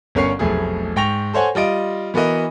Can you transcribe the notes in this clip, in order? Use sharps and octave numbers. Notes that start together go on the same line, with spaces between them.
G1 B3 C#4 A#4 C#6 C7
F1 B1 A3 G#4
G#2 G5 C#6 A#6 F7
A4 C5 C#5 F#5 G#5
G3 F4 D#5 D7
E3 B3 F#4 A#4 D#5